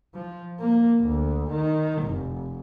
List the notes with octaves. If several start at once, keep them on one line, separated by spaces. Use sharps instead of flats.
F3
A#3
D2
D#3
F1